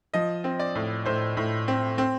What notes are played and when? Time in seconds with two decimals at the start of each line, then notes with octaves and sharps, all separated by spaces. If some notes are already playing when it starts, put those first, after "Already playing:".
0.14 F3 D#5
0.44 C4
0.59 D5
0.75 A2
1.06 A2 C5
1.37 A2
1.68 C4
1.98 C4